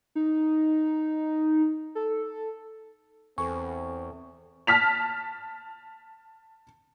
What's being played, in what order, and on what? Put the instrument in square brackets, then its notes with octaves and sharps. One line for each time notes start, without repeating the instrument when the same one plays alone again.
[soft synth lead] D#4
A4
[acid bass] E2 [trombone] C4 [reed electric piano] A4 G#5 [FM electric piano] C#6
[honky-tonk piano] A5 F6 B6 F7